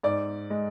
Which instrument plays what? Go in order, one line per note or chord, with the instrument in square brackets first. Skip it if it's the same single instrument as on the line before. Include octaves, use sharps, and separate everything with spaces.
[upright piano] G#2 D5
G#3